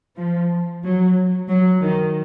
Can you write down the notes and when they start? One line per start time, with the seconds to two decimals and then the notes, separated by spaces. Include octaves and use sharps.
0.18 F3
0.83 F#3
1.49 F#3
1.81 D#3